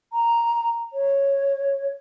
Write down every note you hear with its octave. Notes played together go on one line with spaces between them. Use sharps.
A#5
C#5